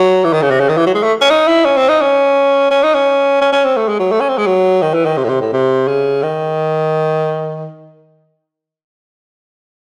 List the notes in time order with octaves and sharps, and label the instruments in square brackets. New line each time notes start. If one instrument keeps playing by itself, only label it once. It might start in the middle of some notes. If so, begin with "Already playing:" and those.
Already playing: [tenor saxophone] F#3
E3
D#3
C#3
C3
C#3
D#3
E3
F#3
G#3
A3
C#4
D#4
E4
C#4
C4
D#4
C#4
C#4
D#4
C#4
C#4
C#4
C4
A3
G#3
F#3
A3
C#4
C4
G#3
F#3
D#3
E3
D#3
C3
A2
C3
A2
C3
C#3
D#3